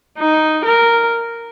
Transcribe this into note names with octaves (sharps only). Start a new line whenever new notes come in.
D#4
A#4